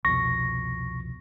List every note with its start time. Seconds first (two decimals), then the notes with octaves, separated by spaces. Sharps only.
0.05 C2 F2 B2 C#6 A#6